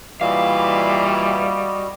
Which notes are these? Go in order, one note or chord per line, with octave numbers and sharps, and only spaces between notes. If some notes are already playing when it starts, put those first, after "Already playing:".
A#2 E3 G3 F#4 D5 D#5 F5